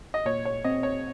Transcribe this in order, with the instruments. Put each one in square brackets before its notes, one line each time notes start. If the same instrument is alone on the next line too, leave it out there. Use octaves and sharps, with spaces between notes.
[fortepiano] D#5
[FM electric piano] A#2 [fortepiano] C#5
[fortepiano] C#5
[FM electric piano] C4 [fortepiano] D#5
[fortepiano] C#5